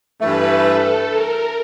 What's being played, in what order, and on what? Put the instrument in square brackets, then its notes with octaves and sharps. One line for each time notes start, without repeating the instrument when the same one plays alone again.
[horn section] G2 E3 A3 [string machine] B4
[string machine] A4
A#4